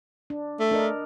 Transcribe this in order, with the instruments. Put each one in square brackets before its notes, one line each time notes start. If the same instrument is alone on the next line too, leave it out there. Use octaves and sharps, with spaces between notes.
[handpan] D4
[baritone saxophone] A3
[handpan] D4 A#4 D#5